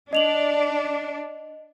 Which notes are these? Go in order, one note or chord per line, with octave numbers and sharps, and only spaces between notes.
D4 D#5 F7 F#7